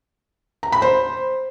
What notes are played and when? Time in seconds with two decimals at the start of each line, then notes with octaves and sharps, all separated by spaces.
0.63 A#5
0.72 B5
0.82 C5